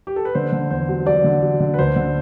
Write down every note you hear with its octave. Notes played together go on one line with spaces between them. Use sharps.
G4
A4
B4
D3 C5
D3
E2 C5
F#3
F#3 D5
D3
F#3
D3
B4
D2 C5
D3